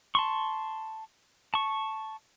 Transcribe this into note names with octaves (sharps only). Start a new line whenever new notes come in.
A5 C6 C#6
A5 C#6